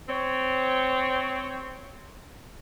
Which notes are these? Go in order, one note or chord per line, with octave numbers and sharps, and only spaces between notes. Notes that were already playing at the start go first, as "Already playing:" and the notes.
C4 C#5